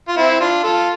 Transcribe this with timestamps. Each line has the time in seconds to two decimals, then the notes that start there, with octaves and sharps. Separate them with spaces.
0.09 F4
0.17 C4 E4
0.41 D4 F4
0.63 F4 A4